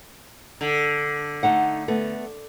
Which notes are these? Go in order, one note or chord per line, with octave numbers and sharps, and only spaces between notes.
D3
A3 D#4 F#5
A3 B3